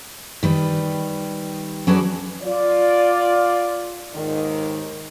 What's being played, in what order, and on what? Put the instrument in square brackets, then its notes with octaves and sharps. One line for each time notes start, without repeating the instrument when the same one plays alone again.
[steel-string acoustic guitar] D#3 G3 B4
F#3 C#4 G#4 A4 B4 D5
[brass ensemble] F4 D5
D#2 G#2 D#3